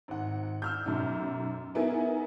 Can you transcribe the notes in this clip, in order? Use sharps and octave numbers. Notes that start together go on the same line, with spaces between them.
G#1 F#5
E6 F6 G6
B1 F#2
B3 D#4 E4 G#4 A#4